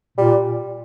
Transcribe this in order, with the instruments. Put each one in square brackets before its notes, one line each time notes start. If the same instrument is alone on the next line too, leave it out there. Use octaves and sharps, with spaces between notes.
[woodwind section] A#2 [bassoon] G3